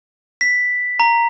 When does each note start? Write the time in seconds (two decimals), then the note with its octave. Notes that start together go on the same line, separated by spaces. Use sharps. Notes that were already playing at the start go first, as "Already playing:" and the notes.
0.41 B6
1.00 A#5